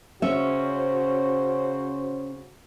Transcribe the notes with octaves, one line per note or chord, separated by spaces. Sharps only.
C#3 C#4 F#4 C5 E5